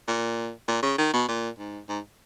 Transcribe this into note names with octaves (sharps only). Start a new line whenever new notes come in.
A#2
A#2
C#3
D#3
B2
A#2
G#2
G#2